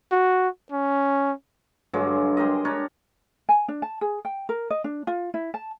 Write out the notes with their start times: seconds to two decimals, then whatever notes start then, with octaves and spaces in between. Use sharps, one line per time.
0.12 F#4
0.72 C#4
1.93 G2 D3 F#3 G#3
2.37 G#3 G4 A#4 D#5
2.65 D4 A#4 C#5
3.49 G#5
3.68 D4
3.82 A5
4.01 G#4
4.25 G5
4.49 A#4
4.70 D#5
4.84 D4
5.07 F4
5.34 E4
5.54 A5